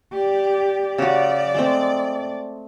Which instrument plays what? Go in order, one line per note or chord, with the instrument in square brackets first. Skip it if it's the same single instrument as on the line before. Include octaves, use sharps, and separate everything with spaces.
[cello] G4 D5
[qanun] C#3 F#4 [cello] D5
[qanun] G#3 A3 C4